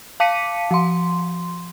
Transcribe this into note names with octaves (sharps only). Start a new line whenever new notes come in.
F5 A5 D6 B6 C#7 D#7
F3 C6